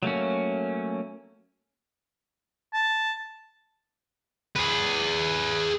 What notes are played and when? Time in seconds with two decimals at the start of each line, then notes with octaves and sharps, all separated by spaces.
0.03 F#3 A3 A#3 C#4
2.74 A5
4.56 G#4 B4